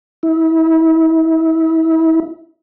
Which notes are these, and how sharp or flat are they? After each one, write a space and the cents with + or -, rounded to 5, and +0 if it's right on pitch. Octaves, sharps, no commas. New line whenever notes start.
E4 -35